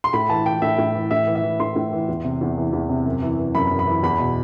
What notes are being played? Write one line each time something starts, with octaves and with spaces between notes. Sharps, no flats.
C6
A2 B5
E3 A5
E3 G5
A2 E5
A2
E3
A2 E5
E3
E5
E3
A2 C6
A2
E3
E2
C3
E2
E3
E2
C3
F#2
E3
E3
F#2 B5
F#2
B5
E3
E2 B5
B2